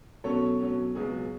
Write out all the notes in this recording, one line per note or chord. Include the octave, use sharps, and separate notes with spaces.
B2 F#3 C#4 A4 C#5
B2 F#3 C#4
C#2 B2 F#3 B3 G#4